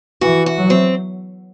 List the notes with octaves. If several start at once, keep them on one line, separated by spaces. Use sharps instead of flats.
E3 F#4
F#4
F#3
C4